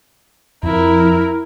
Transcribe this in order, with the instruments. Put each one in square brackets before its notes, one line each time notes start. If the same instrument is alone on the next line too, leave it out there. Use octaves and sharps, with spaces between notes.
[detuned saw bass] F2 [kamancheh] E4 A#4